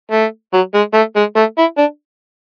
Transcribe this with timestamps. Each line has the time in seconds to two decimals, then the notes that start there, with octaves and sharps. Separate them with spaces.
0.12 A3
0.54 F#3
0.74 G#3
0.94 A3
1.16 G#3
1.37 A3
1.58 E4
1.78 D4